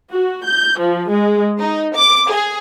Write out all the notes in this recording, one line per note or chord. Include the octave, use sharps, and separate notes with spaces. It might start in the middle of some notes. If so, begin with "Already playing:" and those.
F#4
G6
F3
G#3
D#4
D6
G#4